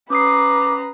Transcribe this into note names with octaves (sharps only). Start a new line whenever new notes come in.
C#4 B4 A#5 D6 D#6 C7